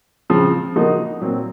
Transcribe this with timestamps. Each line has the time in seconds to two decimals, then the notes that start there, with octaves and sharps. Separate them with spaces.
0.30 C#3 F3 C4
0.76 C#3 F3 A#3 D#4 F#4
1.20 A#2 F#3 C4